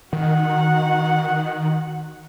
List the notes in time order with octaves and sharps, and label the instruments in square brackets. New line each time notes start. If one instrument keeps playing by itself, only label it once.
[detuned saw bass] D#3 [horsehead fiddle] F#4 F#5